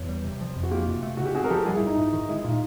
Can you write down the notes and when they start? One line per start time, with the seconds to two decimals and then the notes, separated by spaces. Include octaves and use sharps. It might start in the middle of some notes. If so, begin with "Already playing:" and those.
Already playing: E2 B4 C#5
0.09 G3
0.24 C3
0.41 F3
0.56 F2
0.63 F#4
0.71 A#3 F4 G4
0.87 C3
1.03 A3
1.17 C#3 F#4
1.26 G4
1.35 C4 F#4 G#4
1.44 A#4
1.50 F3 G4 A4
1.65 G3 F#4 G#4
1.76 E4
1.81 G#2
1.87 D#4
1.97 G#2 E4
2.13 D#3
2.29 G#3 E4
2.44 A#2 D#4 F4